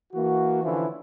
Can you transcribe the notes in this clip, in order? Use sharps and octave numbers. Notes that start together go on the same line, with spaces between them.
E3 A#3 F#4
D3 E3 F3 C#4 E4